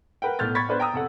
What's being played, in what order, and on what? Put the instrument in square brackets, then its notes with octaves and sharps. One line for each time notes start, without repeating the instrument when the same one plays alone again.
[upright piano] A#4 B4 F#5 G5
B1 A2 B3 F6 G6 A6
B5 C#6 G#6 A6 B6
B3 D4 B4 C5
G5 A#5 D#6 E6
F1 A4 F#5